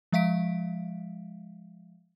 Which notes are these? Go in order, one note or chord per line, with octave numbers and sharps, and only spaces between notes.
F3 G#3 E5 F5 B6 D7